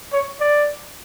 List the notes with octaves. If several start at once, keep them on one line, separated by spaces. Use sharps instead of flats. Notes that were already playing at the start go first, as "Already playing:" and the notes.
C#5
D5